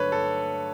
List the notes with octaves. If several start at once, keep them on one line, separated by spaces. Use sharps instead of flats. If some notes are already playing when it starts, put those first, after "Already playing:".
Already playing: G2 D3 F#3 A3 B4 C#5
A4